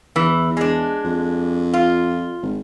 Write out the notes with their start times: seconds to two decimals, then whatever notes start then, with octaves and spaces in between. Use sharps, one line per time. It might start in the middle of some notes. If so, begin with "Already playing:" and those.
0.16 E2 E3
0.57 G#3 D4
1.05 F2
1.73 F4
2.43 G#1